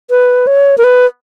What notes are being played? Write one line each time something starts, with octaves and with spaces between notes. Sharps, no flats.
B4
C#5
A#4
B4